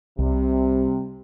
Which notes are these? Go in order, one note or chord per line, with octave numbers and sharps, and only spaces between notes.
C2 C3 G3